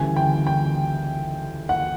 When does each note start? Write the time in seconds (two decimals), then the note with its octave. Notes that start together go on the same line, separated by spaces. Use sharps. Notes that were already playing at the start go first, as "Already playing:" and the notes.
Already playing: D2 C#3 E3 G3 G#5
0.16 G5
0.47 G5
1.69 F#5